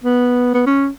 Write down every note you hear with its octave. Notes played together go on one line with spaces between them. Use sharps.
B3
B3
C#4